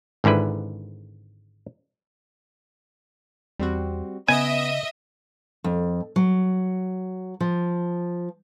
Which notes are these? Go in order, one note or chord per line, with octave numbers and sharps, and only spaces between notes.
G#1 G#2 D3 E4 B4
E2 G3 C4 F#4
C#3 B3 D#5 E5 G#5 D#6 D7
F2
F#3
F3